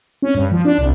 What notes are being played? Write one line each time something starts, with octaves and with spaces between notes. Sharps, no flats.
C#4
G2
F3
D4
C2